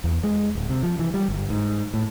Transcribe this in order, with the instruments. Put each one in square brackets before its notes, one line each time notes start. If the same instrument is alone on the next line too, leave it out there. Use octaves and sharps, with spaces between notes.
[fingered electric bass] E2
G#3
D1
C3
F3
E3
G3
G1
G#2
A2